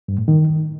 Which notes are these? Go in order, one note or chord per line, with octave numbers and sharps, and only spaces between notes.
G2
A2
D#3